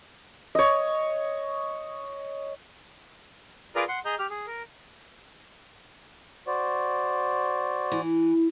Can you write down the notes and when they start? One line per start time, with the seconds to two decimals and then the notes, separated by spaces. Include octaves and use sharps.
0.55 C#5 D#5
3.76 F4 G#4 A#4 B4 D5 A#5
3.88 F#5 C6
4.05 G#4 D#5 A#5 G6
4.19 G4 F6
4.30 G#4
4.47 A#4
6.47 F#4 C5 D5
7.92 E3